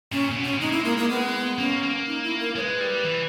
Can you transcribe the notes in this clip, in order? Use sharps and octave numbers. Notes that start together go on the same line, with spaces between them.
A#2 C#4
A#2
B2
C#4
G#3 D#4
A#3 E4
G#3 A#3
A#3
B3
A#3 C#4
A#3
D#4
E4
A#4
G#3 C#5
B4
G3
E3